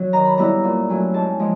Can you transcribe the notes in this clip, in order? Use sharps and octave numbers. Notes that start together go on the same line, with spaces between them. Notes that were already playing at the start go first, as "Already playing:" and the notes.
Already playing: F#3
D#3 A#5
B5
G3 B3 E4 A#5
A#2
F#3 A3 C#4
G#2 A5
F3 G#3